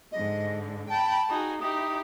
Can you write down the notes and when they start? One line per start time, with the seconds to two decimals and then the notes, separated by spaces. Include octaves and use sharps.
0.12 G#2 D3 D#5
0.90 G5 A5 B5
1.29 D#4 F#4 G#4
1.61 D#4 E4 G4 D#6